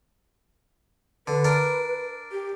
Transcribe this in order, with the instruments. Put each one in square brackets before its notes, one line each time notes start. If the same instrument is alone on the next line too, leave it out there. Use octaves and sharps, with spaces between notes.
[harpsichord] D3 [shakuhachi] B4
[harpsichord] D4 A#4
[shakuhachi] G4